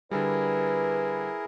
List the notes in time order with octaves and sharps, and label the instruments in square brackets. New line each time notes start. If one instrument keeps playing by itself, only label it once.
[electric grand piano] D3 G3 [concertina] E4 G#4 A#4 [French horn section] B4